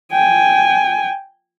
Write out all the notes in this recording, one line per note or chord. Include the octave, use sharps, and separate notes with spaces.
G5 G#5